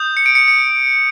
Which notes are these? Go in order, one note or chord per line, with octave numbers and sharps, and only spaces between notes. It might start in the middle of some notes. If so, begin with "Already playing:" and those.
Already playing: D#6 G6
C#7
D7
C#7
C#7